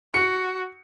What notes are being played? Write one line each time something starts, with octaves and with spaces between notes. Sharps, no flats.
F#4 C#7